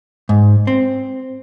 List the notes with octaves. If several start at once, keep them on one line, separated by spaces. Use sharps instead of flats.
G#2
C4